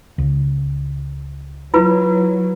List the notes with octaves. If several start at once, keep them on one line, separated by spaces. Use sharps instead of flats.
C#2
F#3 E4 F4 B4